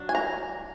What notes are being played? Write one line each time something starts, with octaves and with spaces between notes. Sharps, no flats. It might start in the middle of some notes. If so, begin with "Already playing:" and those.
Already playing: F#3 D4
G#5
A#5